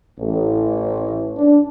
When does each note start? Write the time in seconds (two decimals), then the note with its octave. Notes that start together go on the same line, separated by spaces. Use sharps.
0.18 A1
1.37 D4